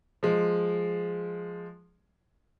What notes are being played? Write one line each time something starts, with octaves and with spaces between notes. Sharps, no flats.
F3 G#3